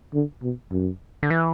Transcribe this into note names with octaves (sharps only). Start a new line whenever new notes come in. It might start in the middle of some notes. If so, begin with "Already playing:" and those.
D3
B2
F#2
D3
E3